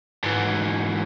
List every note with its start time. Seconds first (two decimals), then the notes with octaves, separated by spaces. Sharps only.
0.24 G#2 E3